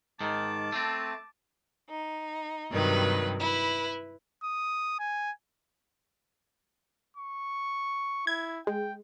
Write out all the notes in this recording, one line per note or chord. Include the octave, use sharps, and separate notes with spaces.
G#2 D#3 A5 D6
A3 C4
D#4
G2 C3 D#3 F#3 B4
E4 B4
D#6
G#5
C#6
E4 G#6
G#3 G5